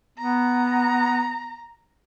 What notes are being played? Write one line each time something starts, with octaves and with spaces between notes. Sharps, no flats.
B3 A#5